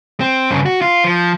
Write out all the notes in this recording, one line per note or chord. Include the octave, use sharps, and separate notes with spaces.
C4
G2 C#3
F#4
F4
F3